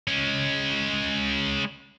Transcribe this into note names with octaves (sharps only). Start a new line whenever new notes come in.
G#3 C#4